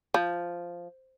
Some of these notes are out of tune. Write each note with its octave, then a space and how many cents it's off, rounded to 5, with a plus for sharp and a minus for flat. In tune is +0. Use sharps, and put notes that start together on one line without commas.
F3 -5